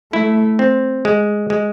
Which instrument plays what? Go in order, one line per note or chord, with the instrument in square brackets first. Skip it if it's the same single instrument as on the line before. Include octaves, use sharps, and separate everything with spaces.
[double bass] A3 [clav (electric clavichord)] E4
[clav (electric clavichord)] C4
G#3
G#3